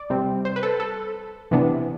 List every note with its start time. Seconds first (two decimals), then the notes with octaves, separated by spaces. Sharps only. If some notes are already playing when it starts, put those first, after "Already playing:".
Already playing: D5
0.10 C3 G3 C4
0.45 C5
0.56 B4
0.63 A4
0.80 A4
1.51 C3 E3 B3 D4